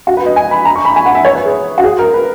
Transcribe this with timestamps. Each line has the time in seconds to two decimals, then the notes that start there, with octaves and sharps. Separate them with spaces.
0.07 F#4
0.17 B4
0.26 D#5
0.36 G#5
0.51 B5
0.65 A#5
0.76 C#6
0.85 B5
0.96 G#5
1.06 F#5
1.15 E5
1.25 C#5
1.35 B4
1.45 G#4
1.78 F#4
1.84 G#4
1.99 A#4
2.14 B4